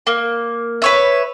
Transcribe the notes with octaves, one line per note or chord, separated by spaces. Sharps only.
A#3
B4 C#5 E5